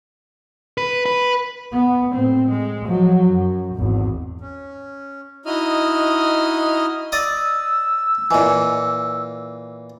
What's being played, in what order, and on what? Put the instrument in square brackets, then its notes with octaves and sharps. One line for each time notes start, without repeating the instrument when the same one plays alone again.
[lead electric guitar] B4
B4
[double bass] B3
A2 C4
G#3
F3 F#3
F#2
G#1 E2
[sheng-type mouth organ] C#4
D#4 E4 F#4 D#5 D#6 F6
[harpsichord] D5 D#5 D#6 [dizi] E6
[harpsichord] A#2 E3 [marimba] D#5 G#5